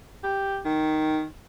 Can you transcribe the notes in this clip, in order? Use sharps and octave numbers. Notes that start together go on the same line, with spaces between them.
G4
D#3